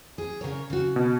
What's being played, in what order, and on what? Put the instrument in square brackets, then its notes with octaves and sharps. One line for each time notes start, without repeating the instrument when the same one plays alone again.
[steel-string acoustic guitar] G#4
C#3 A#4 C#5
C#3 F#4
[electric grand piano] B2